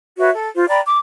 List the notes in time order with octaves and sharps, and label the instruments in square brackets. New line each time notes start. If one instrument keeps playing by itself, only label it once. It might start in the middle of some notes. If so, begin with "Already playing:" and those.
[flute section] F#4 B4 C#5 E5
A4
F4 C5
D5 G5 A#5 B5
D6